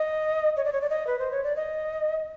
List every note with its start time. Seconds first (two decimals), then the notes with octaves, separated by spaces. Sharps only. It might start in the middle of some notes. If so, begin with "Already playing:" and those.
Already playing: D#5
0.57 C#5
0.65 D5
0.73 C#5
0.81 D5
0.90 D#5
1.07 B4
1.19 C5
1.32 C#5
1.44 D5
1.56 D#5